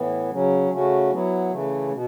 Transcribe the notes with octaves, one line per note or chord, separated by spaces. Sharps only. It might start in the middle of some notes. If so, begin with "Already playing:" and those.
Already playing: A2 E3 B3
C#3 F#3 C#4
C#3 A3 C#4 F#4
F#3 B3 E4
C#3 E3 A3
B2